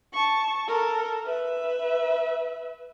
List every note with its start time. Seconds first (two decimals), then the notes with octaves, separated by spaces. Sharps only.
0.13 A5 C#6
0.68 A4 A#4
1.26 B4 E5